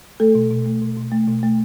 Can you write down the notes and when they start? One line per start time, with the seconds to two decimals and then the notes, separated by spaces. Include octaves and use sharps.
0.20 A3 A4
0.35 B2
0.51 B2
0.66 A3
0.81 B2
0.97 B2
1.12 A3
1.28 B2
1.43 A3